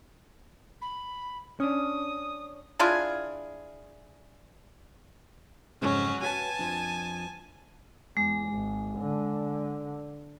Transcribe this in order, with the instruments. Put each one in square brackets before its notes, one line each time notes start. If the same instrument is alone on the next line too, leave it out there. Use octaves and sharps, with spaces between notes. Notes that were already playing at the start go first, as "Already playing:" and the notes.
[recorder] B5
[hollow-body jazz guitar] C#4 D4 [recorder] D#6
[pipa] D4 E4 F4 G#4
[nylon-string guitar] F2 G#2 C#3 [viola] F#3 C#4
[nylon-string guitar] F#4 B4 C#5 [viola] G#5 A5
[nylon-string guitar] F2 F3 D4
[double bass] E2 [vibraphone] G#3
[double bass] G#1
D3